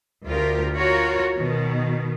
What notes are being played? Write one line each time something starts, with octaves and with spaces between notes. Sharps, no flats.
D2 F4 G4 A#4
F4 F#4 A#4 C#5
B2 D#3